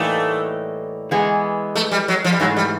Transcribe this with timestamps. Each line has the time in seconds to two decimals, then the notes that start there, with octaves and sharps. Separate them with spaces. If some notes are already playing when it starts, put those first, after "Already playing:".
Already playing: A2 E3 G3 A3 A#3 D#4
1.11 E3 G#3 B3
1.75 A3
1.91 G3
2.08 F#3
2.24 F3
2.32 G3
2.40 G#2 E3 F#3 A3
2.57 G3